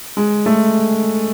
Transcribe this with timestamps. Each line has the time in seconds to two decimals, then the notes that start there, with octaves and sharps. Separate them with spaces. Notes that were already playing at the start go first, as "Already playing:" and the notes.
0.17 G#3
0.46 A3